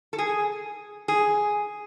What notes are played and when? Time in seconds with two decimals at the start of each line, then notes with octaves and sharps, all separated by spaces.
0.13 A4
0.18 G#4
1.08 G#4